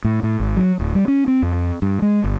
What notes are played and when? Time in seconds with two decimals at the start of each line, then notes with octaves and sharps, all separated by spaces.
0.04 A2
0.23 A2
0.40 G#1
0.57 F#3
0.79 D1
0.95 G3
1.08 C#4
1.28 C4
1.42 F2
1.82 G2
2.02 G#3
2.24 G1